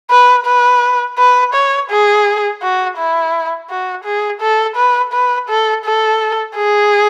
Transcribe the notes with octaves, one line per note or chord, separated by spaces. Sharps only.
B4
B4
B4
C#5
G#4
F#4
E4
F#4
G#4
A4
B4
B4
A4
A4
G#4